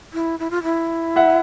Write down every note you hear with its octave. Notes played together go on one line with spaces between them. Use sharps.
E4
E4
F4
E4
E5 F#5